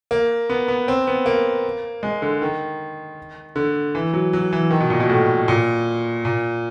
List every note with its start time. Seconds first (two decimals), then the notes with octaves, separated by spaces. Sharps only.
0.11 A#3
0.50 B3
0.68 B3
0.88 C4
1.07 B3
1.26 A#3
2.03 G#3
2.22 D3
2.42 D#3
3.56 D3
3.95 E3
4.14 F#3
4.33 F#3
4.53 E3
4.70 D#3
4.80 B2
4.90 A#2
5.00 B2
5.09 A2
5.48 A#2
6.25 A#2